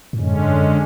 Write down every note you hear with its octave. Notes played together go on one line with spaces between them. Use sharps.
G#2
F#2 D3 G#3 C#4
G#2
F#2